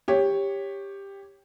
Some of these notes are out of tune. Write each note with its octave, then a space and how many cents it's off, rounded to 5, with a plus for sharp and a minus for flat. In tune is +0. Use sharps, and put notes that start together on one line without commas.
G4 +10 C#5 -5